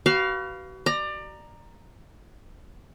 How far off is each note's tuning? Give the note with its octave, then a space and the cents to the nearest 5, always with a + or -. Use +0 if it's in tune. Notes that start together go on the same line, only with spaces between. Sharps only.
F#4 +40 B4 +0 F5 +0
D5 +25 A#5 +0